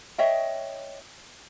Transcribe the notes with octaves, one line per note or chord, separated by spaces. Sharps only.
C#5 D#5 E5 G5